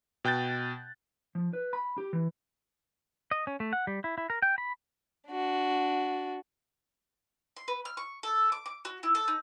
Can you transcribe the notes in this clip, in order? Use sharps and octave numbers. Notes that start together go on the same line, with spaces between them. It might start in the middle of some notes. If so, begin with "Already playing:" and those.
B2 G5 F#6 G6 A6
F3
B4
B5
G4
E3
D#5
C#4
A3
F#5
G3
E4
E4
A#4
G5
B5
D4 F#4
C6
B4
F6
C#6
A4
D6
D6
F#4
E4
A4
D#4